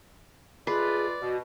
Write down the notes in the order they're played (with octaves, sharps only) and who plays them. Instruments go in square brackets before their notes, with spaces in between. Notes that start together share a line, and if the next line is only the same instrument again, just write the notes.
[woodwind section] G#3 A3 F4 [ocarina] G#4 [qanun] B4 [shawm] D5
[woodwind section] B2 [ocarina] F#4